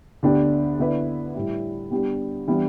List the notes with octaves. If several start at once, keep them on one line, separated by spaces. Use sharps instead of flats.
D2 D3 B3 D4 G4
D3 B3 E4 B4 D5
A2 G3 E4
G3 B3 D4 G4
E3 G3 B3 D4